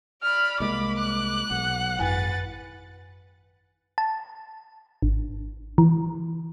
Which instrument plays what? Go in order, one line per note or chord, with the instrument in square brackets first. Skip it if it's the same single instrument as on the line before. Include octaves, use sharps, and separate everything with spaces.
[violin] D5 B5 [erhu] F6
[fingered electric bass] C2 G#3 A#3 [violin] B5 [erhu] D6
[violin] F#6
[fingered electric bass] B1 [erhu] F#5
[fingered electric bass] G#1 [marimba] F#2 G#5 [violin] B4 A6
[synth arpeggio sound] A5
G#1
E3